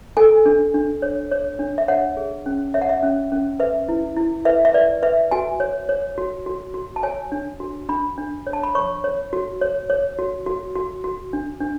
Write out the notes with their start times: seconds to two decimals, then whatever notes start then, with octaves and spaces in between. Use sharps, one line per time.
0.17 A4 G#5
0.46 D4
0.74 D4
1.02 C#5
1.31 C#5
1.59 D4
1.78 E5
1.88 C#5 F#5
2.17 G#4
2.46 C#4
2.74 C#5 E5
2.82 F#5
2.89 E5
3.03 C#4
3.32 C#4
3.60 B4 E5
3.89 E4
4.17 E4
4.45 B4 E5
4.65 E5
4.74 B4 D5
5.02 B4 E5
5.31 F#4 G#5
5.60 C#5
5.89 C#5
6.18 F#4
6.46 F#4
6.74 F#4
6.96 A5
7.03 C#5 G#5
7.32 D4
7.60 F#4
7.89 D4 B5
8.18 D4
8.47 C#5
8.53 A5
8.63 B5
8.75 C#5 C#6
9.04 C#5
9.33 F#4
9.61 C#5
9.90 C#5
10.19 F#4
10.46 F#4
10.75 F#4
11.04 F#4
11.33 D4
11.61 D4